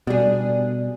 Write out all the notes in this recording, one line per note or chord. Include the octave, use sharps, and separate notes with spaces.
B2 G3 D4 G#4